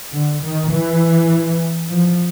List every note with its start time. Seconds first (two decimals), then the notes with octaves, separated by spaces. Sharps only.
0.14 D3
0.44 D#3
0.72 E3
1.91 F3